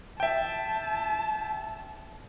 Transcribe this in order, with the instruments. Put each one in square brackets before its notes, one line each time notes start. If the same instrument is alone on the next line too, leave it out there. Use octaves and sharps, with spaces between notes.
[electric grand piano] E5 G5 [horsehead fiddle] A5